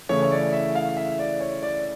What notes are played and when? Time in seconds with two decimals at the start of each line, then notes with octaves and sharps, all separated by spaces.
0.09 C#3 E3 A3 E4 C#5
0.23 C#5
0.31 D5
0.53 E5
0.75 F5
0.97 E5
1.19 D5
1.41 C#5
1.62 D5